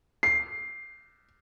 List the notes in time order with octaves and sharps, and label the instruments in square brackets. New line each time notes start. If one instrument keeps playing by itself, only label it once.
[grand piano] C7